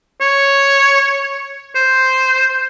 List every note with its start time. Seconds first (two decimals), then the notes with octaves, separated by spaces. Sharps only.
0.21 C#5
1.75 C5